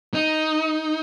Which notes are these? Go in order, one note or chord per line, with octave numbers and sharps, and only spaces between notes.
D#4